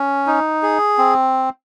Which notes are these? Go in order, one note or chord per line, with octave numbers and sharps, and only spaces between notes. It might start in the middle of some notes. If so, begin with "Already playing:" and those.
Already playing: C#4
D#4
G#4
C4